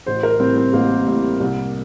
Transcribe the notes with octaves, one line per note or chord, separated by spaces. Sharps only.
A1 C5
A#4
A2 G3 C4
C4
A1 A#3
A2 G3
C2